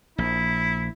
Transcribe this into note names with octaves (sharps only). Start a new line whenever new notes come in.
A#1 E4